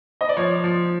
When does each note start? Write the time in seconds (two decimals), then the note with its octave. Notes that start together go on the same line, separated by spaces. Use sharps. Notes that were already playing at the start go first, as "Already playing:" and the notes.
0.21 D#5
0.29 D5
0.37 F3 C#5
0.64 F3